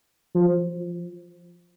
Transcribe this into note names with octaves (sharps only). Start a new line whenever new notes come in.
F3